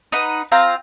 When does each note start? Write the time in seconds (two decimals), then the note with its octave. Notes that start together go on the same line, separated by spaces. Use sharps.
0.12 D#4 B4 F#5
0.52 C4 F4 F5 A#5